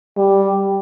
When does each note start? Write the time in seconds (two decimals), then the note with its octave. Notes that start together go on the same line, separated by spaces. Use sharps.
0.17 G3